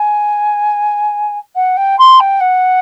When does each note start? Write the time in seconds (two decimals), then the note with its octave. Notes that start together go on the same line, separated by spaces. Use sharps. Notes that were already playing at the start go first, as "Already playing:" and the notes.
Already playing: G#5
1.55 F#5
1.77 G5
1.99 C6
2.20 G5
2.40 F#5